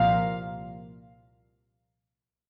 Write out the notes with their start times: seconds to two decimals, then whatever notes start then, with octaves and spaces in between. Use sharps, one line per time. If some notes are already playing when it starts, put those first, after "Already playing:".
Already playing: C2 A#2 F3 F5